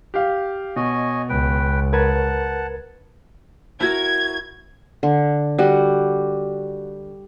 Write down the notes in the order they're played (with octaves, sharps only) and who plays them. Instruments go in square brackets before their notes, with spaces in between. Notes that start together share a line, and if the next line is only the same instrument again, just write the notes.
[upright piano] G4 F5
[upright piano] B2 [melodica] C#5 D#5 G#5
[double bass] C#2 [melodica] B4 G5
[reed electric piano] A#4 B4 [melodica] F#5 A5 [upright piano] G#6
[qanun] E4 F#4 A#4 [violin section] G#6
[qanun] D3
G3 F#4